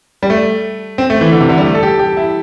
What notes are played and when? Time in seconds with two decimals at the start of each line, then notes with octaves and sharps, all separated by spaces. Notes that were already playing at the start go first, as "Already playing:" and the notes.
0.23 G3
0.30 A3
0.98 C4
1.10 A3
1.21 E3
1.32 D3
1.41 C3
1.49 D3
1.58 G3
1.66 A3
1.75 A4
1.83 G4
1.99 G4
2.17 E4